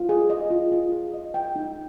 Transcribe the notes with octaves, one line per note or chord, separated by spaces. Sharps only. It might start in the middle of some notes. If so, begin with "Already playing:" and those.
Already playing: F4
G#4
D#5
F4
F4
G#4
D#5
G5
D#4